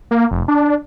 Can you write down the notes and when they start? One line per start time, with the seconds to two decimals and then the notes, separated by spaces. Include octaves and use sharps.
0.11 A#3
0.31 F1
0.48 D4